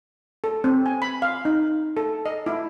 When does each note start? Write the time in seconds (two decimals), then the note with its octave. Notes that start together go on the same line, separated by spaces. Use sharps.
0.44 A4
0.64 C4
0.86 G#5
1.02 B5
1.22 F5
1.45 D#4
1.97 A4
2.26 D#5
2.46 E4